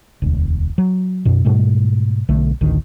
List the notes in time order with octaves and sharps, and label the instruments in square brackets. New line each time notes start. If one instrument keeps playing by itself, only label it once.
[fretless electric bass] E1 D2
F#3
F#2 B2
G#2 B2 G3 A3
B1 D3 A3
A1 D2 D#3